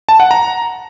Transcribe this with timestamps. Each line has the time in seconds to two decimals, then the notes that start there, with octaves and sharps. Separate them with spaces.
0.09 A5
0.20 F#5
0.31 A#5